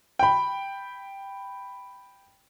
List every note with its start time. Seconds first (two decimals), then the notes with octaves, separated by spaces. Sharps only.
0.19 G5 B5